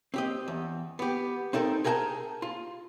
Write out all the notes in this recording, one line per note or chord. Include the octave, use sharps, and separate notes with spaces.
C4 G4 D#5
E2
B3 G4
C4 D#4 A4 A#4
G#4 A#4 F#5 G5 A5 A#5
F4